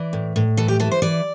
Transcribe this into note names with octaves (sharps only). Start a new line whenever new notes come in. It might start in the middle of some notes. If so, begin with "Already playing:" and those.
Already playing: E3 D5
A2
A2
E3 A4
G4
E3 A4
C5
E3 D5